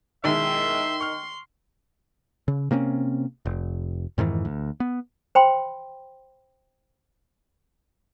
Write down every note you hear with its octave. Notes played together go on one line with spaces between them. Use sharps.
B1 D#3 G#3 E4 E5 C6
C#6 F6
C#3
C3 A#3 C4 C#4
F1
F2 G#2 D#3 E3
D2
B3
C5 G5 B5 C6